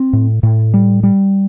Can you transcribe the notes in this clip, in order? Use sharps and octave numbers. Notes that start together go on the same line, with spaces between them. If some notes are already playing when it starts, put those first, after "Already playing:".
Already playing: C4
A2
A2
G3
G3